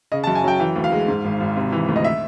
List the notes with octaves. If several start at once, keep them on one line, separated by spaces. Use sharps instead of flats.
C#3 D#5
A5
F#2
G#5
F#3 G5
E3 G5
D2
F5
G#3
G#2
G#1
G#1
C3
E3
D2
D#5
E5